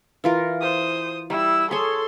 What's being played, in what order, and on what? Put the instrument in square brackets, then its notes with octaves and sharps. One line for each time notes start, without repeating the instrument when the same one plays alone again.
[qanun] E3 F4 A#4
[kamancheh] C5 D#6
[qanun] G3 [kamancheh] E4 E6
[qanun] G#4 C#5 [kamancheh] A4 C6